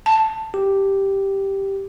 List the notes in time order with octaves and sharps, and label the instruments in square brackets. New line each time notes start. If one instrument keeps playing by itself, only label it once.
[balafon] A5
[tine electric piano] G4